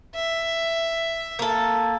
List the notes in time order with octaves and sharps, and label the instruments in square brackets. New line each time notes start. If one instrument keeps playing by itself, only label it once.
[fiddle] E5
[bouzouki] A#3 A4